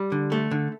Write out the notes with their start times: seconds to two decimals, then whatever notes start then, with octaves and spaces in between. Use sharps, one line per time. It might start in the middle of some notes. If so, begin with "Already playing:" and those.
Already playing: G3
0.12 D3
0.32 A3
0.51 D3